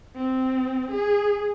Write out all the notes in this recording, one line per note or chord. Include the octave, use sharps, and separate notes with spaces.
C4
G#4